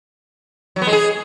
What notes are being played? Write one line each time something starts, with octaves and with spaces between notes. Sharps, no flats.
F#3
B3
G#3
G#4